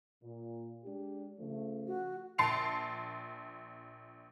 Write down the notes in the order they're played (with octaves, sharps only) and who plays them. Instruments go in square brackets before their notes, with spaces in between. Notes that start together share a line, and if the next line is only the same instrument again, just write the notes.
[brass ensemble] A#2
G#3 D4 G4
C#3 F3 A3
[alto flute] F#4
[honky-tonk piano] A#1 A5 C6 C7 C#7 F7